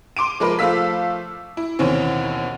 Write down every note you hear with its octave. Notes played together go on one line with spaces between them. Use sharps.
C6 D6 D7 D#7
F3 G#3 A#4 B4
F3 A3 F5 E6 B6
E4
D#2 B2 E3 C4 C#4